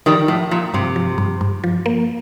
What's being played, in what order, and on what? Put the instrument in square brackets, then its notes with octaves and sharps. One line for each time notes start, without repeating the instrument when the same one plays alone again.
[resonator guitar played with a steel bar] D#3 G3 [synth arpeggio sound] F3
[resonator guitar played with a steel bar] A2 [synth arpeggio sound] F3
[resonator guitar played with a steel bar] A#2 [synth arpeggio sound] F3
[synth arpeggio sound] G2 [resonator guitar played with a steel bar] C3
[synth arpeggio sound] F3
G2
G2
F3
A#3